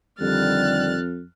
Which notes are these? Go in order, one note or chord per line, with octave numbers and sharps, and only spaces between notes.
F2 D3 D#3 G3 F6 F#6 A6